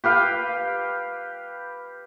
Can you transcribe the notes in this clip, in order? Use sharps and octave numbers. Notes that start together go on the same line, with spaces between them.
G4 B4 F5 G5